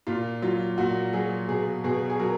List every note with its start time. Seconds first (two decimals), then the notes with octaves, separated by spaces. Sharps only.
0.07 A#2 F4
0.42 F#3 F4
0.78 A#2 F#4
1.13 F#3 G#4
1.48 B2 G#4
1.84 B2 G#4
2.10 G#4
2.19 F#3 A#4